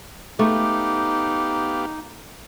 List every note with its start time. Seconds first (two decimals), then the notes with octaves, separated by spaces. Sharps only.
0.39 A3 B3 D#4 G4 F5 D6